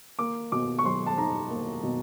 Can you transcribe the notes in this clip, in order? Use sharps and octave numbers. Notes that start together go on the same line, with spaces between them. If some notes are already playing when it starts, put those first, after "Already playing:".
A#3 D6
B2 D6
C#6
F#3 C6
A5
D#4 A#5
A#3
B2